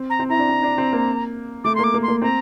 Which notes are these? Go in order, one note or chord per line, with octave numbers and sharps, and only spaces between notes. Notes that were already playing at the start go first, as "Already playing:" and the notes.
Already playing: C4
A#5
C4
E4 A#5
D4
C4
D4
C4
A#3
A3 D6
A#3 C6
D6
A#3
C6
A#3
C4 A#5